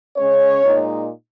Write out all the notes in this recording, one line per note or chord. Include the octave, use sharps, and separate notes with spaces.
C#3 G#3 C#4 C#5
A#2 G#3 D#4